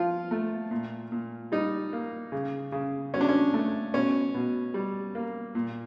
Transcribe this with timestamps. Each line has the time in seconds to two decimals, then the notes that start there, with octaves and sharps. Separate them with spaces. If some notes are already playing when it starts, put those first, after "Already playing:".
Already playing: F3 F4
0.31 A3
0.71 A#2
1.12 A#2
1.52 G3 D#4
1.93 A#3
2.32 C#3
2.72 C#3
3.14 F#3 C#4
3.21 D4
3.29 C#4
3.54 A3
3.93 B2 C#4
4.34 B2
4.74 G3
5.15 A#3
5.55 A#2